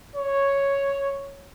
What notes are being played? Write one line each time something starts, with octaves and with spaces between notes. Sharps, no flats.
C#5